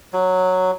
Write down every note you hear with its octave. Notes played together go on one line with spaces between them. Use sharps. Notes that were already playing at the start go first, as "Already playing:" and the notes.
F#3